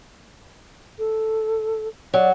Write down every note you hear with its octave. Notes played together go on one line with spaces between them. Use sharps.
A4
F#3 D5